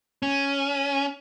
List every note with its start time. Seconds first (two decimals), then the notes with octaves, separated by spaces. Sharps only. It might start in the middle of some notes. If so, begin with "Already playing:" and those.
0.23 C#4